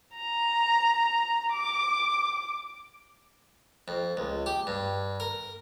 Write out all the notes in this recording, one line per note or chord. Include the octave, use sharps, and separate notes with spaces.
A#5
D6
F2
C#2
G4
G2
A#4